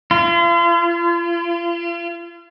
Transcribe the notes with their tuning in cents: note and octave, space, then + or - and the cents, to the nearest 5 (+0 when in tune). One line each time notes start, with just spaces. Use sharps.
F4 -40